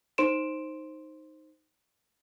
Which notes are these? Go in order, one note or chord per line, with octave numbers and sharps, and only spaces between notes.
D#4 C5 C6 D7 E7